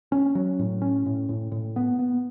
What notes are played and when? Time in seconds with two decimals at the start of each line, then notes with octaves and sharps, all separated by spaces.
0.12 C#4
0.35 F#3
0.59 A2
0.82 C#4
1.06 A2
1.29 A2
1.52 A2
1.76 B3
1.99 B3